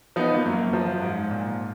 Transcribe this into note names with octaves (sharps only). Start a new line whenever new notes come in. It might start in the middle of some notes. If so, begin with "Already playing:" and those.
F3 B3 D#4
A#3
F#2
A#3
F3
G#2
A#2